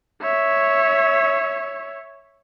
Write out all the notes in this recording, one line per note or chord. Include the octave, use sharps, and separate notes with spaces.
C#5 E5